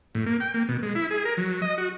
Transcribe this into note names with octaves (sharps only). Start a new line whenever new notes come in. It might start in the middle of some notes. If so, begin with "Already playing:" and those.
A2
A#3
G5
A#3
B2
G#3
E4
G#4
A#4
F#3
D#5
F#4